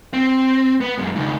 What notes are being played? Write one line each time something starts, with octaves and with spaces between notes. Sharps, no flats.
C4
B3
F#2 G#3
C#2 D#3